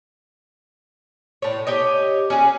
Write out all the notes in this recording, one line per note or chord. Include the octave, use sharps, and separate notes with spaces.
A2 C#5
G4 C#5 D#5
C#4 F#4 G#4